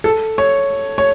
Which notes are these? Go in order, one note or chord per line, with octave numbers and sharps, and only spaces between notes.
A4
C#5
C#5